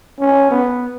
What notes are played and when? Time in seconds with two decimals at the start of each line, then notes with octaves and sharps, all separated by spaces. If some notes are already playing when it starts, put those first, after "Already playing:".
0.20 C#4
0.51 B3